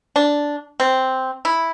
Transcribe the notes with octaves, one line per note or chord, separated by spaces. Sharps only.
D4
C4
E4